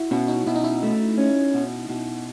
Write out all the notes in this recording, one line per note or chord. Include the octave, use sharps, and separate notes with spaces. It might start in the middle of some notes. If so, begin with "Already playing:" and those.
Already playing: E4 F#4
B2 C#4
D#4
B2 E4
D#4
E4
A3
C#4
B2
B2